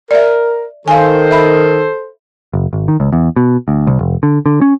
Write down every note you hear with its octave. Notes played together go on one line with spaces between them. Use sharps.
A#4 D5 E5
D#3 A4 C5 F5 G#5
E5 B5
F#1
G#1
D#3
C#2
E2
B2
D2
C2
F1
D3
D3
C#4